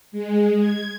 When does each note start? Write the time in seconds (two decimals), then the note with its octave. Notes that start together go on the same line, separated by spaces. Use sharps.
0.12 G#3
0.60 G#6